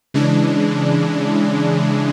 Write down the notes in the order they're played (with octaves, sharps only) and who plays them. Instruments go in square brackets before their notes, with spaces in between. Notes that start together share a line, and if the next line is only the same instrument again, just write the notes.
[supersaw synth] C#3 E3 G#3 D4